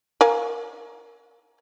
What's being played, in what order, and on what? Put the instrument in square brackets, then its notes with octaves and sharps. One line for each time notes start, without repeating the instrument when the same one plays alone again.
[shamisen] A#4 F5 G#5